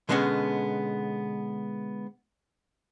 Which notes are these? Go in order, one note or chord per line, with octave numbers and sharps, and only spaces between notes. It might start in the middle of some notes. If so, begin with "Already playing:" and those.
B2 D3 G#3 A#3 B3 C#4